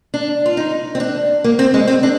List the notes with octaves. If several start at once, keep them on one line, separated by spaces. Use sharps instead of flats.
D4
F4
D#4
C4
D4
A#3
C4
G#3
C4
D4